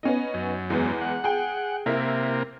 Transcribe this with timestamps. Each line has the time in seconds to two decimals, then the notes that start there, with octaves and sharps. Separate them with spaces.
0.03 B3 C#4 D#4
0.34 F#2
0.70 E2 G#3 B3
1.01 F#5
1.24 G#4 G5
1.86 C3 A#3 E4 A#4 E5